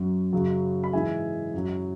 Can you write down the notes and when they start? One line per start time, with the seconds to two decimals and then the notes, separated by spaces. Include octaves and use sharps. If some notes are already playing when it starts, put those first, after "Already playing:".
Already playing: F#2 F#3
0.33 F#2 C#3 F#3
0.84 B5
0.93 G#2 E3 G#3 E5 G#5
1.54 F#2 F#3